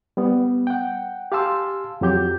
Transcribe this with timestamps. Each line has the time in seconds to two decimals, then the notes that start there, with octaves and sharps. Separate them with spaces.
0.17 G3 B3
0.67 F#5 G5
1.32 G4 F5 G#5 A5 C6 E6
2.01 F2 F#3 G4 G6